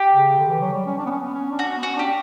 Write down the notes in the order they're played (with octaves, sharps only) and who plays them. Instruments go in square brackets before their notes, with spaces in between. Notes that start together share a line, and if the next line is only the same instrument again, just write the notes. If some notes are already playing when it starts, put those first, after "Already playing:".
Already playing: [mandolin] G4
[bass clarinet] C#3
D3
E3
F#3
G3
C#4
D4
B3
C#4
B3
C#4
D4
[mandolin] F#4
[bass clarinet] C#4
B3
[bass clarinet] C#4 [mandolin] F#4
[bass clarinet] D4
[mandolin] G4